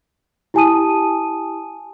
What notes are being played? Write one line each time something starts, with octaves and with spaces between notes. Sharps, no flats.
E4 G4 G#5 A5 D#6 D#7